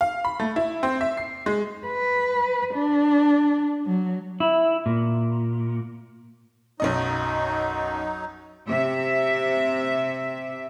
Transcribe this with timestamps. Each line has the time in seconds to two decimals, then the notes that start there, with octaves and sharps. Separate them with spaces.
0.01 F5
0.25 B5
0.40 A3
0.56 E4
0.83 C4
1.01 E5
1.17 C7
1.46 G#3
1.87 B4
2.74 D4
3.86 F#3
4.40 E4
4.86 A#2
6.80 B1 F#2 F#3 D#4 D#5
8.68 C3 E5